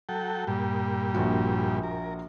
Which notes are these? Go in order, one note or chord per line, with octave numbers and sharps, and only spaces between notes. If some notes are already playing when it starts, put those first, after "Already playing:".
F#3 A4 G5
G2 A#2 G3
A#1 F3 F#4
A#4